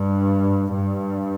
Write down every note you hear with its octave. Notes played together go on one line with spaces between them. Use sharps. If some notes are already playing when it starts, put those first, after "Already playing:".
Already playing: G2
G2